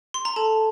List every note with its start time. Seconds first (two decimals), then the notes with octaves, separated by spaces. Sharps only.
0.14 C6
0.25 A#5
0.36 A4 A5